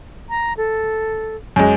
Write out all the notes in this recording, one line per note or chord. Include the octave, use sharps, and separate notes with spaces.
A#5
A4
F#2 G#3